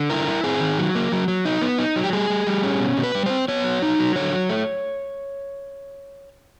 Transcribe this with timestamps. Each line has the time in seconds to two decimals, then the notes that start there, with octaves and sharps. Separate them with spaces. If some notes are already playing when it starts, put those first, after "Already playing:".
Already playing: D3
0.10 E4 A#4
0.28 E4
0.43 C4 G#4
0.60 D#3
0.78 F#3
0.95 A#3
1.12 F#3
1.28 F#3
1.45 D#4
1.62 B3
1.78 D#4
1.96 F#3
2.04 G4
2.13 G3 G#4
2.30 G3
2.47 G3
2.63 C#4
2.80 B2
2.97 B2
3.03 B4
3.15 G3
3.26 C4 C5
3.48 B3 C#5
3.64 F#3
3.82 D#4
3.99 F#3
4.15 D3 C#5
4.32 F#3
4.49 A3